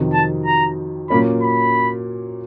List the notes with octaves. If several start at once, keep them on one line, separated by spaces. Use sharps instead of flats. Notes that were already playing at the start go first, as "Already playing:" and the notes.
Already playing: F2 C3 D#3 F#3
A5
A#5
A#2 F#3 A#3 C#4 B5
B5